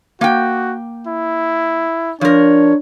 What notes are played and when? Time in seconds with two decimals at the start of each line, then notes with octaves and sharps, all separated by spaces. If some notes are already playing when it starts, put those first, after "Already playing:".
0.21 A#3 F#4 G5
1.07 E4
2.21 F3 D4 A#4 C#5